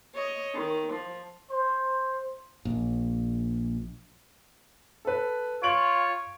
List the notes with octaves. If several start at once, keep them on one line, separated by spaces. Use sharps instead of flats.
C#5 D#5
D#3
F3
C5
A#1
A4 B4
F4 C#5 D7 F#7